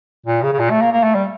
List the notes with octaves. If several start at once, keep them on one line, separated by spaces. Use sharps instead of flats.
A#2
C#3
C#3
A#2
A3
A#3
A#3
A3
G3